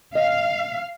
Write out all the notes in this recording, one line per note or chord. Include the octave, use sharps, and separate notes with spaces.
D#5 F5